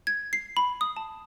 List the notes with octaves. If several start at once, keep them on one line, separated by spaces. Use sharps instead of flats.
G#6
C7
B5
D#6
A5